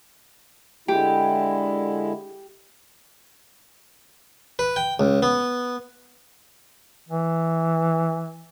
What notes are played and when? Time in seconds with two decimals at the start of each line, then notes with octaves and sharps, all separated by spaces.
0.88 D3 G#3 E4 G4
4.59 B4
4.76 G5
5.00 C#2
5.22 B3
7.09 E3